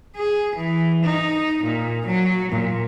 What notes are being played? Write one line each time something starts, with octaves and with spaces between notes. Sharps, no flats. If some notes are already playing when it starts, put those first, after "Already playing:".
G#4
E3
D#4
A#2
F#3
A#2